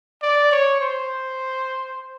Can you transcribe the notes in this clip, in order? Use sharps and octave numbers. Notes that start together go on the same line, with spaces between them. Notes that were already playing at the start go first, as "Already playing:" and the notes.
D5
C#5
C5